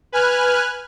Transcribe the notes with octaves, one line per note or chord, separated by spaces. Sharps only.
B4 G#5 F6 F#6